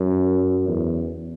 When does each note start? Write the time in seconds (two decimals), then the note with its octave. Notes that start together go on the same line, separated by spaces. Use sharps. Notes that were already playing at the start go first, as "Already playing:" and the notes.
Already playing: F#2
0.68 E2